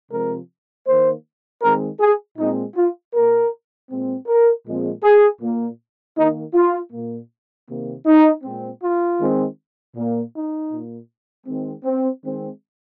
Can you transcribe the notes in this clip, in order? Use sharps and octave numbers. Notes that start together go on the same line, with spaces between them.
C3 F3 G#3 C4 A#4
D#3 A#3 C5
D#3 G#3 C4 A#4
G#4
A#2 G#3 C4 D#4
F4
A#2 A#3 A#4
A#2 G#3 C4
A#4
A#2 F3 G#3 C4
G#4
A#2 A#3
D#3 A#3 D#4
F4
A#2 A#3
C3 D#3 A#3
D#4
A#2 G#3 C4
F4
D#3 G#3 C4
A#2 A#3
D#4
A#2 A#3
D#3 G#3 C4
C4
D#3 G#3 C4